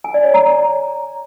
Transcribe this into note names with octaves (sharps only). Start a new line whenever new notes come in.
G#5
D5
C#5
A#5